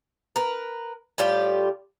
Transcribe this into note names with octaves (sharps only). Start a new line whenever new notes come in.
A#4 B4
A2 G3 F4 G4